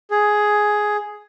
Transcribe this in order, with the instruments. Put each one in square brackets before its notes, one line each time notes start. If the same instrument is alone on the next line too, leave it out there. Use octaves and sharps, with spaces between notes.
[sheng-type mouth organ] G#4